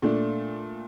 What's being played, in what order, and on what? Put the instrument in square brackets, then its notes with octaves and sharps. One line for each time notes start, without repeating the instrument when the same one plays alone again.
[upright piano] A#2 A3 D4